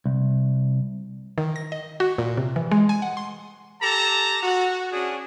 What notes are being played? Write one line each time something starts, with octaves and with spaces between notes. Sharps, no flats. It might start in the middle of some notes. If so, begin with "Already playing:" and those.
C2
D#3
A#6
D#5
F#4
A#2
C3
E3
G#3
G#5
F#5
C6
G4 A4 A5 A#5
F#4
C#4 D4 F#4 G#4